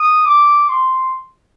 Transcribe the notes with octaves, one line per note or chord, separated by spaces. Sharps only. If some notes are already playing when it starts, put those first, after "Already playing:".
Already playing: D#6
D6
C6